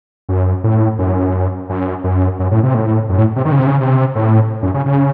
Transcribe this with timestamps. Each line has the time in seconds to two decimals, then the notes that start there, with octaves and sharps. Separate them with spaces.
0.29 F#2
0.64 A2
0.98 F#2
1.70 F#2
2.04 F#2
2.39 F#2
2.51 A2
2.63 C3
2.74 A2
3.09 F#2
3.18 A2
3.36 C3
3.45 D#3
3.52 C#3
3.59 C3
3.67 C#3
3.80 C3
4.15 A2
4.62 F#2
4.74 C#3
4.86 C#3